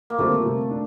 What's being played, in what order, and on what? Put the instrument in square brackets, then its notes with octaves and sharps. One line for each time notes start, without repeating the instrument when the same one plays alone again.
[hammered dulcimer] A#3
[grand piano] D3 G3 C4 F4 [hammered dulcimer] A3
[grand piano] C3
D4